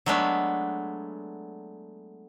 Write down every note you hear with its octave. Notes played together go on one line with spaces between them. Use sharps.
F#3 G#3 A3 B3 D4